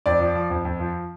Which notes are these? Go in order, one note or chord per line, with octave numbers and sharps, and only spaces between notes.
F2 D5
F3
F3
F2
F2
F3